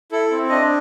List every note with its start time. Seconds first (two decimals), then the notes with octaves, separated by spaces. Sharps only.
0.12 E4 A4
0.31 C4
0.50 D4 D#5